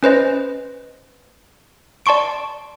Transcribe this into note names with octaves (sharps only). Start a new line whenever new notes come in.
C#4 B4 C5 D#5
D5 A5 C6 C#6 D7